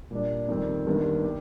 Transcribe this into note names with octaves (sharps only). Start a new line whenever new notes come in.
A#2 G3 D4
F2 D#3 G3 C4
G1 G2 D#3 A#3
G4